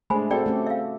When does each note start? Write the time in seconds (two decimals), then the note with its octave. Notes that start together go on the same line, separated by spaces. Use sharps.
0.10 G#3 A3 D4 C5 G#5 B5
0.30 C4 F#4 G#4 A4 C5 D5 G5
0.46 A3 C#4 G4
0.67 E5 F5